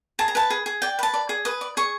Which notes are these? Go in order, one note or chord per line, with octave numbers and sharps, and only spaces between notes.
G#4 A5
A#5
B4 A5
G#4
G#4
D5 G5
B4 A5
D5
G#4
B4 D#6
D5
G#4 C#6